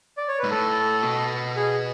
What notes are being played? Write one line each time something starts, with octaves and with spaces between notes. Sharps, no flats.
D5
C#5
G#2 B4
A2 A4
B2
G#4